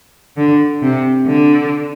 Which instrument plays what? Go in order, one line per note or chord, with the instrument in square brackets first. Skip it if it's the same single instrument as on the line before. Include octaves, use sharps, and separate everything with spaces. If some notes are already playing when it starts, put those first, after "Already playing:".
[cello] D3
C3
D3